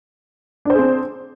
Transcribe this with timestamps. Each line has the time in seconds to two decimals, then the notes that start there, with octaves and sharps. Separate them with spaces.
0.65 D4
0.70 C5
0.74 G#4
0.79 C4